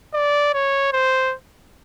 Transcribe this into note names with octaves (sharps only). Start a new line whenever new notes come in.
D5
C#5
C5